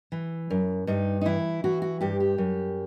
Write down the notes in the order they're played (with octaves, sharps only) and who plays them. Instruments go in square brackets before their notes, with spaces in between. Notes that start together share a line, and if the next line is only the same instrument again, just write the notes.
[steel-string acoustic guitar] E3
F#2
G2 D#4
D#4
E3 E4
E3 F#4
F#4
G2 G4
G4
F#2